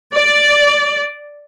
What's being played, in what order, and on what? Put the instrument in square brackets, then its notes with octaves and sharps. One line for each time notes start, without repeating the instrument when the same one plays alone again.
[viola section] D5